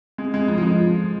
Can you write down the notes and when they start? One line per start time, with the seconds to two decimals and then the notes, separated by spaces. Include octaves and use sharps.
0.18 G#3
0.34 G#3
0.48 F3
0.58 G#3
0.63 F3